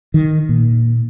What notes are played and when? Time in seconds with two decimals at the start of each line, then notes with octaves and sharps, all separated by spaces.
0.14 D#3
0.49 A#2